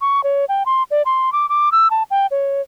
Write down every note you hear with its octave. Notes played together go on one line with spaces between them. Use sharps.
C#6
C#5
G5
C6
D5
C6
D6
D6
E6
A5
G5
C#5